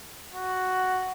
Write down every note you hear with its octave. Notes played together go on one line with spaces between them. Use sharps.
F#4